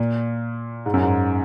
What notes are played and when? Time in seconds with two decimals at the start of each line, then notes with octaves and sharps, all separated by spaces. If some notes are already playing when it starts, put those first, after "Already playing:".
Already playing: A#2
0.86 G#2
0.94 F#2
1.03 G#2